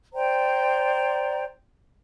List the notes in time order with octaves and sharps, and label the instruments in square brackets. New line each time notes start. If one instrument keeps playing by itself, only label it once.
[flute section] C5 D5 G5 A#5